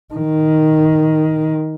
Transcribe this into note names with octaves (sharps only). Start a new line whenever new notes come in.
D#3